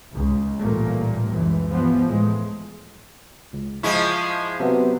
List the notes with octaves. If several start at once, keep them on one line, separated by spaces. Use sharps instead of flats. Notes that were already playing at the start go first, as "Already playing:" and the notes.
C#2
A1 A#2 G3 A3 A#3
C#2 F#2 E3
G2 E3 F3 B3
A2 E3 G#3
C#2
F3 G#3 E4 C#6
C3 F#3 B3